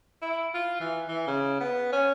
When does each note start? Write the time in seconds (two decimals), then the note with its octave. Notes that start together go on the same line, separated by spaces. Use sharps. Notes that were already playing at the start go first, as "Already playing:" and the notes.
0.22 E4
0.54 F4
0.80 E3
1.08 E3
1.27 C#3
1.61 B3
1.92 C#4